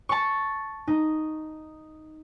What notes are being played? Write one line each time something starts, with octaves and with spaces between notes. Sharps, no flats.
A5 C#6
D#4